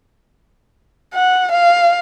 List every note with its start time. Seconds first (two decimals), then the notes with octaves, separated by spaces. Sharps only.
1.14 F#5
1.51 F5